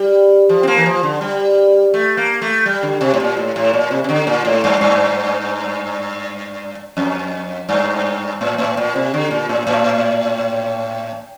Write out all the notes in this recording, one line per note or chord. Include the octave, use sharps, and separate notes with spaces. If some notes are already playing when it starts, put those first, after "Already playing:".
Already playing: G3
F3
C4
A#3
E3
F3
D3
G3
A3
A#3
A3
G3
D3
C3
A2
A#2
A2
A2
A#2
C3
C3
D3
A#2
A2
G2
G2
F2
G2
A2
A2
A#2
C3
D3
A#2
A2
A2